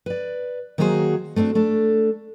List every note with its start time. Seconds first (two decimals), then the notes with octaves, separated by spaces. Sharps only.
0.06 B4 D5
0.78 D#3 F#3 A#3 F#4 G#4 C5
1.36 A3 B3 C4 D4 F#4
1.55 A3 D4 A4